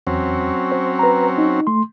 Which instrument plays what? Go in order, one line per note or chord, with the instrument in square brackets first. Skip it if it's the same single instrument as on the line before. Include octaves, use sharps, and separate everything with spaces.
[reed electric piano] E2 [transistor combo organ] F#3 C4 C#4
[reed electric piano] C5
B4 A#5
D#4
A3 C6